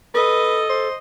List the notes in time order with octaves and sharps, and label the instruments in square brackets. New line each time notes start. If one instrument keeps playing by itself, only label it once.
[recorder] A4 [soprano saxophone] B4 [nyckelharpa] D#5
[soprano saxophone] C5